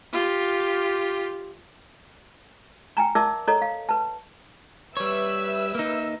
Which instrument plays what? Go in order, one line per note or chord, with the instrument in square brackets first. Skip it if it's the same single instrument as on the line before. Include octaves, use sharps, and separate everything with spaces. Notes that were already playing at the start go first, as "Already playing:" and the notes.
[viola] F4 G4
[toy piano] G5 G#5 A#5
A#4 D5 E5 A5 D6 E6
A4 C#5 D#5 A#5
F5
B4 A5
[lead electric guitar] G3 C#5 [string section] B4 E5 E6
[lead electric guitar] A#3 D#4